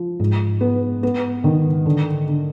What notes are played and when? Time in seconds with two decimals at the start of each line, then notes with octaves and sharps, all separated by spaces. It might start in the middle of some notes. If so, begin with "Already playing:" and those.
Already playing: F3
0.20 G#2
0.61 B3
1.03 B3
1.44 D#3
1.86 D3
2.27 D3